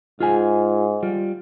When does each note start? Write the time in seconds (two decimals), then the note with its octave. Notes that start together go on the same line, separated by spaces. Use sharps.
0.20 G#2 F4 G#4 G#5
1.03 G3 F4